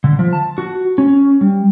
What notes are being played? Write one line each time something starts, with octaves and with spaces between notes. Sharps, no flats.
D3
F3
A5
F#4
C#4
G3